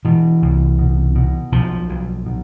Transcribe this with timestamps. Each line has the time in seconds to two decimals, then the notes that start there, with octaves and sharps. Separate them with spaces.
0.05 B2 E3
0.42 C2
0.79 B2
1.15 B2
1.52 B1 F3
1.89 B1
2.26 B2